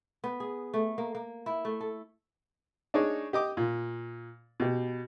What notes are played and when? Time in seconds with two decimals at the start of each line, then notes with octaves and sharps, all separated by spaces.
0.24 B3
0.40 G#4
0.74 A3
0.98 A#3
1.15 A#3
1.46 E4
1.65 A3
1.81 A4
2.94 D4 D#4 G#4 C#5
3.33 G4 D#5 D6
3.57 A#2
4.60 B2 G4